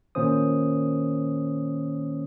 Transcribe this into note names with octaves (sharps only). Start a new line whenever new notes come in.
A#2 D#3 A#3 C#4 C5 D#6